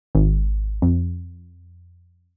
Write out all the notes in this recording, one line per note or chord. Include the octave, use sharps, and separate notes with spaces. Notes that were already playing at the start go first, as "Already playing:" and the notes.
G#1
F2